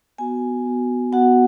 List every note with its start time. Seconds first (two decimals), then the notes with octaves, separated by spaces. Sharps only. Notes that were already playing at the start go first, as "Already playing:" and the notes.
0.18 B3 F#4 G#5
0.66 B3 F#4
1.12 B3 F#4 F#5